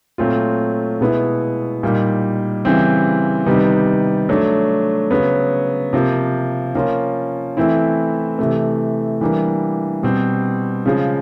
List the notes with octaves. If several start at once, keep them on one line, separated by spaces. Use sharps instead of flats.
A#2 F#3 A3 C4 F4
B2 G#3 B3 E4
A#2 G3 A#3 D#4
C#3 E3 G3 C4
C3 D#3 G3 B3 D#4
F#3 A3 D4
C#3 F#3 B3
C3 F3 A#3
F3 A#3 C#4 F4
E3 A3 C4 E4
C3 E3 A3
E3 G3 A#3 D4
B2 G3 C4
C#3 F3 G#3